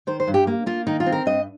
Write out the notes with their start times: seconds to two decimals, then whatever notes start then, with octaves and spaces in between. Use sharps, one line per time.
0.07 D#3 C5
0.20 C5
0.27 G2
0.34 G4
0.47 A#3
0.66 A#3 F4
0.87 D#3 D#4
1.00 F4
1.06 C4
1.12 A#4
1.26 G2 D#5